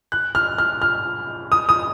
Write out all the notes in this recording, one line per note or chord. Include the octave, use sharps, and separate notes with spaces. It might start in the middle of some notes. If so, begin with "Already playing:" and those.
F#6
F6
F6
F6
D#6
D#6